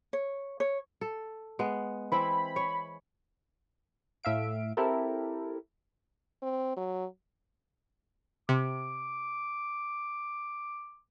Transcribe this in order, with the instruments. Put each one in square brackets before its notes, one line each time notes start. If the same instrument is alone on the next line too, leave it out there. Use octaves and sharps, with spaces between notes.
[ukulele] C#5
C#5
[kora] A4
G#3 B3
[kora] E3 C4 E4 [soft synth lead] B5
[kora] C#5
[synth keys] A2 E5 F5 D7
C4 E4 G4 A4 A#4
[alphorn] C4
F#3
[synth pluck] C3 [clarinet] D6